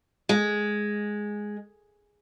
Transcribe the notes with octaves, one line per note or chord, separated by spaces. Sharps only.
G#3